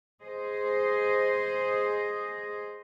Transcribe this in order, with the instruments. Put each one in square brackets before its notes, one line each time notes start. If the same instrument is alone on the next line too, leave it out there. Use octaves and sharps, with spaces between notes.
[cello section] G#4 C5 D#5